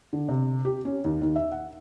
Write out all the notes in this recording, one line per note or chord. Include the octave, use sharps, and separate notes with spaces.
D3
C3
G4
C#4
D#2
D#2
E5
F#5